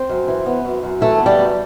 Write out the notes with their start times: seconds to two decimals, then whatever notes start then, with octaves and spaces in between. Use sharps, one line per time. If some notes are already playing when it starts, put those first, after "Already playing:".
Already playing: C4 C5
0.09 F#2
0.28 E3
0.46 B3
0.65 F#2
0.83 F#2
1.01 E3 A3 A4
1.20 B3
1.26 G3 G4
1.39 F#2